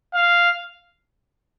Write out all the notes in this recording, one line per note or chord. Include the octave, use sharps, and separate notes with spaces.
F5